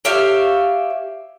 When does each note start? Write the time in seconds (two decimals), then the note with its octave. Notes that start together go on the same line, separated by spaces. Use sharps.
0.05 G4 C#5 E5 F5